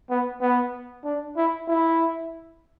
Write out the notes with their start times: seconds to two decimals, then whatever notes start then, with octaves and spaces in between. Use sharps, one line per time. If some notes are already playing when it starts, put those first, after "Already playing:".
0.10 B3
0.41 B3
1.04 D4
1.37 E4
1.68 E4